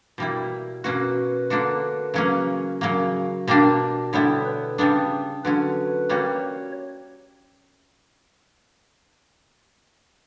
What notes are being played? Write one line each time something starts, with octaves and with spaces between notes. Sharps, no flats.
B2 G3 A#3 E4
B2 A#3 C#4 F#4 B4
D3 A#3 D4 F#4
C#3 F#3 A#3 C#4
C#3 F#3 A#3
B2 G3 A#3 D4
D3 G3 B3 E4 C#5
B4
C#3 G3 B3 D4
D3 F#3 C#4 B4
G3 A#3 C#4 F#4 C#5